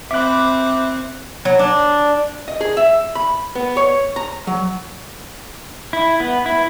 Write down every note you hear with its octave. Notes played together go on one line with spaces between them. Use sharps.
C4 E5 B5 D6 F#6
F#3
D4
D#5
G#4
E5
B5
B3
C#5
A#5
F#3
E4
B3
E4